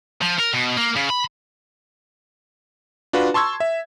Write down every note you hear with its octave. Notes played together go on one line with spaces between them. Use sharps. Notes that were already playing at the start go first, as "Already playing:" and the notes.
F3
A#4
B2
A#3
C#3
B5
D4 F4 F#4 B4
A5 C6 C#6 E6 G#6
E5